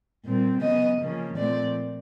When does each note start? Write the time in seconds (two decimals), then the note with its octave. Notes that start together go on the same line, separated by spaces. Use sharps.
0.25 A#2 G3 C4
0.61 C#3 F#3 B3 D#5
1.00 C#3 F3 A#3 C#4
1.37 A#2 F3 A3 C4 D5